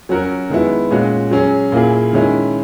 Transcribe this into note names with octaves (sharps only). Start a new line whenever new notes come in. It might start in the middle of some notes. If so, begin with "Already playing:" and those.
F#3 C#4 F#4 A#4
D#3 G#3 B3 E4
A#2 G#3 C#4 F#4
F#3 C#4 G#4
A#2 A#3 E4 G#4
D#3 G#3 C#4 E4